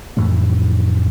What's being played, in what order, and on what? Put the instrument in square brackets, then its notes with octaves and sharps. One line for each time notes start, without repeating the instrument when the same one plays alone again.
[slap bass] F2 A2 E3 A3